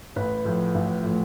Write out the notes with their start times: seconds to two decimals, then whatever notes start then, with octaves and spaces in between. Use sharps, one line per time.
0.16 A1 B4
0.45 A2 F3
0.75 A1
1.05 A2 F3